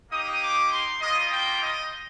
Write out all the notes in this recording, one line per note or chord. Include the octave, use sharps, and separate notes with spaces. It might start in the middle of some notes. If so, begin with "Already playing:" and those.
A#3 D#4 G4 D#6
D6
C6
G3 A#3 F4 D#5
G5
D#5